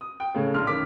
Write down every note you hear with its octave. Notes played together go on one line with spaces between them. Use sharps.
D#6
G5
A2 C#3
A#1 C6 F6
F#2 D#3 D6 B6